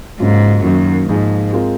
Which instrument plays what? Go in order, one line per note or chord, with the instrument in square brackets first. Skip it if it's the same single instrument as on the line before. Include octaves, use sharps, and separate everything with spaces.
[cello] G#2 [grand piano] C#3 F#3 A#3 C#4 F4
[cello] F#2 [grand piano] D#3 A#3 D#4 F#4 A#4
[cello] G#2 [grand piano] F3 A#3 D#4 G#4
[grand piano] G#3 C4 F4 A#4